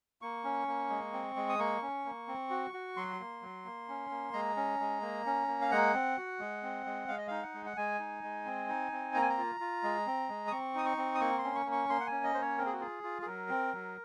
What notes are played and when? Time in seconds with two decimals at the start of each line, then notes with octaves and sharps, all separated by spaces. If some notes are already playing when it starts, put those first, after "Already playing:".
0.22 A#3 C#6
0.44 C#4
0.68 A#3
0.90 G#3
1.13 C4
1.36 G#3
1.49 D#6
1.59 A#3 C#6
1.82 C#4
2.05 A#3
2.28 C4
2.50 F#4
2.73 F#4
2.96 F#3 C6
3.20 A#3
3.42 F#3
3.65 A#3
3.88 C#4
4.11 A#3
4.33 G#3 A#5
4.57 C#4
4.80 G#3
5.02 A#3
5.26 C#4
5.48 A#3
5.61 F5
5.71 G#3 F#5
5.94 C4
6.17 F#4
6.40 G#3
6.63 C4
6.86 G#3
7.08 G#3 F5
7.18 D#5
7.28 D#4 F5
7.43 F#5
7.54 G#3
7.66 F#5
7.77 G#3 G#5
7.99 D#4
8.23 G#3
8.45 C4
8.68 D#4
8.92 C4
9.14 A#3 A#5
9.22 G#5
9.29 A#5
9.38 F4
9.60 F4
9.84 G#3
10.07 C4
10.29 G#3
10.47 D#6
10.51 C4 C#6
10.75 D#4 D#6
10.86 C#6
10.97 C4
11.15 D#6
11.20 A#3 C#6
11.38 C6
11.44 C#4
11.55 C#6
11.66 A#3
11.72 C#6
11.89 A#3 C6
12.00 F#5
12.07 G#5
12.12 C#4
12.24 D#5
12.34 A#3 C5
12.41 C#5
12.58 C4 A#4
12.66 G#4
12.72 F#4
12.80 F4 G#4
13.03 F4
13.22 G#4
13.26 F#3 A#4
13.49 C4
13.73 F#3